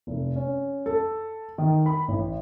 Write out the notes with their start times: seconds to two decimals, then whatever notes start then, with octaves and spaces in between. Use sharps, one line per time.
0.07 F1
0.36 C#4
0.86 A4
1.58 D#3
1.86 B5
2.08 A1